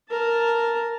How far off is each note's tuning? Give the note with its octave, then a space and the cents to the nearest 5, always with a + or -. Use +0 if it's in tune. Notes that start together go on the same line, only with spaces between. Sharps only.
A#4 +0 A5 +0